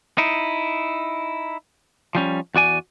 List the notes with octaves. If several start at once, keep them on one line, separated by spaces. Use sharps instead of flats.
D#4 E4
F3 G3 C#4
E2 F#4 D5 G#5